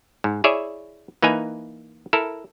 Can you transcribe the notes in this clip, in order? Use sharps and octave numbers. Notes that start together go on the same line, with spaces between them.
G#2
E4 G#4 C#5 D5 E5
E3 A#3 D#4 B4 G#5 A#5
E4 A4 A#4